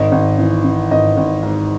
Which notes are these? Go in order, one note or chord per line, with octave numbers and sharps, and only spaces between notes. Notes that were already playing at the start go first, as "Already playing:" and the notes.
Already playing: G#1 D#5
G#1
E3
E3
G#1 D#5
G#1
G#2